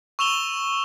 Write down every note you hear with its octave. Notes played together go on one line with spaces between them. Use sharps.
C#6 E6 E7 F7 G7